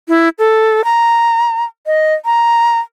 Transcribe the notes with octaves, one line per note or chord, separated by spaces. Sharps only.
E4
A4
A#5
D#5
A#5